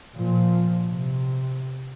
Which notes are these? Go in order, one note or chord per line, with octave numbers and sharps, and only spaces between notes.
A#2 F3
C3